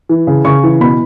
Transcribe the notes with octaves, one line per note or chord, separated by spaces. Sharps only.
E3
C#3
C#3 C#6
E3
B2 B5